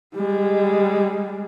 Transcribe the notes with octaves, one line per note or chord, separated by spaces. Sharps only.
G3 G#3